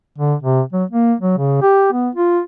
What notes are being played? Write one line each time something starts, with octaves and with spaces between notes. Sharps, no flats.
D3
C3
F#3
A#3
F#3
C#3
G4
B3
F4